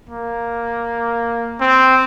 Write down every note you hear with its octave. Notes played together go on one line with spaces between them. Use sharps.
A#3
C4